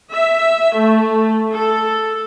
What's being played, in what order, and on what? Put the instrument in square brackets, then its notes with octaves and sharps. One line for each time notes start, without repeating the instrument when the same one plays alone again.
[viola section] E5
A3
A4